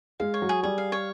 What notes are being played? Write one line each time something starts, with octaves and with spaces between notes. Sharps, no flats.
G#3 F5
C#5
F#3
G#4
G3 G#4
F5
C#5